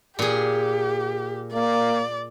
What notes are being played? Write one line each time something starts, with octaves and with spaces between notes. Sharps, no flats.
A#2 G4 G#4
A#3 D5